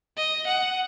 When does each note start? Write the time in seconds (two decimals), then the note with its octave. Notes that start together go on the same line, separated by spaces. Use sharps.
0.17 D#5
0.47 F#5